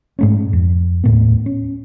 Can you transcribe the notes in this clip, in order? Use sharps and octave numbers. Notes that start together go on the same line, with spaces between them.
G#2 A3 C#4
F2
D#2 A2 B3
C#4